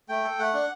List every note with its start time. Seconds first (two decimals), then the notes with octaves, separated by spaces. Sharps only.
0.09 A3 G5
0.24 A4
0.39 A3 F#5
0.54 D4